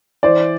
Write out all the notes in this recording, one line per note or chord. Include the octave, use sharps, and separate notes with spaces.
E3 C5 D5